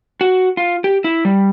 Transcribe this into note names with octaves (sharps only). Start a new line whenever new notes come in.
F#4
F4
G4
E4
G3